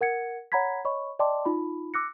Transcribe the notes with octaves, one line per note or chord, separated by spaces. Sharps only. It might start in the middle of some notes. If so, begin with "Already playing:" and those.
A#4 F#5 G#6 C#7
C#5 F#5 A#5 B5 G#6 B6
C#5 D#5 B5 C#6
D5 D#5 G5 A5 C6 D6
D#4 F4 B5
D6 E6 F#6 A#6 C#7